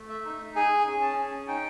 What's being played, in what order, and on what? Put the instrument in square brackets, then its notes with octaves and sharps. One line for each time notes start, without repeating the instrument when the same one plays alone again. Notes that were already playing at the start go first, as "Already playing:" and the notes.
Already playing: [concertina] A3
E5
D#4
G#4 G#5
C#4
A5
C#4
D#4 G5